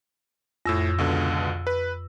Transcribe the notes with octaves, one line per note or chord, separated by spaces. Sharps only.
F2 A2 E6 A#6
C#2 B2 D3
B4